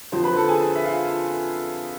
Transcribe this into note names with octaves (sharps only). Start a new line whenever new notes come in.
F2 D3 F3 C5 C6
B4 B5
A4 A5
G#4 G#5
E5
F4 F5